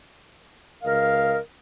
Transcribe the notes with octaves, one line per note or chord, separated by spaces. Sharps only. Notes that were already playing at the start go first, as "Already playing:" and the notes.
C#2 A#4 D#5 F5